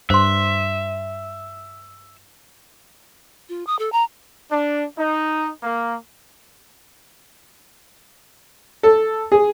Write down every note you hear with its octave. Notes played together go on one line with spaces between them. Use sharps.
G2 C5 E5 C6
F4
D#6
A4
A#5
D4
D#4
A#3
A4
G#4